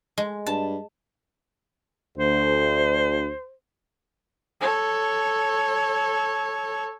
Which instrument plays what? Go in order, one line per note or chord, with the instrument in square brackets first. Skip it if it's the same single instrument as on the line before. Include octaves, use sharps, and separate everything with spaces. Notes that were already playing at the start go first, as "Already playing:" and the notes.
[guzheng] G#3
[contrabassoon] G2 [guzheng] A5
[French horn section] D2 [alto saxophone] C5
[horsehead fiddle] A4 C#5